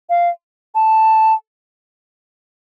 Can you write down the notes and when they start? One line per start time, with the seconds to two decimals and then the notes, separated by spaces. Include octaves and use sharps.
0.10 F5
0.75 A5